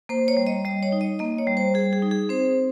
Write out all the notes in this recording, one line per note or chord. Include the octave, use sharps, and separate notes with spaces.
A#3 C5
C#5
G3
D#5
G3 D#5
C#5
D#4
D#5
A#3 D#5
C#5
G3
C5
G3 G#4
G#4
D#4
G#4
C4 C5